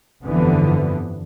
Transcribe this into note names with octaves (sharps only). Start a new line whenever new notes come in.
G1 F2 D3 E3 F3 B3